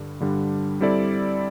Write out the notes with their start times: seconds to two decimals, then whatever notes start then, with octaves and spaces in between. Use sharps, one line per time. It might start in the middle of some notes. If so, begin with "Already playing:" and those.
Already playing: G2 D3 G3 D4
0.20 G2 D3 G3 D4
0.81 G3 C4 E4 A4 D5